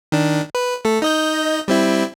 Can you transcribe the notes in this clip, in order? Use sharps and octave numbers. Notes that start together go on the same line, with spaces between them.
D#3 D4
B4
A3 A4
D#4 D#5 G6
G3 C4 E4